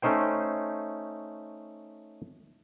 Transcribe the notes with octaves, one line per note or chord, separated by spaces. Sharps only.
A3 C#4 D#4 C5 G5